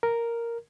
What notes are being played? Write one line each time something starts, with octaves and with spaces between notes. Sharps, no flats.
A#4